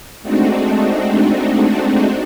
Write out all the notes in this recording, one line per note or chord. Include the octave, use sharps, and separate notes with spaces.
G#3 A3 C4 D4 D#4 F#4